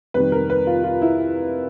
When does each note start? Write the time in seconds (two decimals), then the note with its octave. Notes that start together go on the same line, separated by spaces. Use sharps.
0.14 F2 C3 D#3 G3 B4
0.32 A#4
0.50 B4
0.67 F4
0.84 F4
1.02 E4